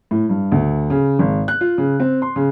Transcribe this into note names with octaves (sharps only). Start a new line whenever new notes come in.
A2
G2
D2
C#3
G#1
F#6
F4
C#3
C4
C6
C#3